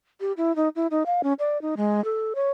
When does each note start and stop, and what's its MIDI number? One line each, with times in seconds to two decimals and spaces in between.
0.21 0.33 67
0.37 0.55 64
0.56 0.69 63
0.76 0.87 64
0.91 1.03 63
1.06 1.21 77
1.23 1.33 61
1.39 1.60 74
1.62 1.75 63
1.77 2.03 56
2.05 2.33 69
2.35 2.51 73